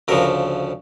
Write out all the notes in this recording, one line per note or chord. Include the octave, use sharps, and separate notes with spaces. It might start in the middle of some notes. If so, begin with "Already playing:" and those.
D2 C#3 F3 A#4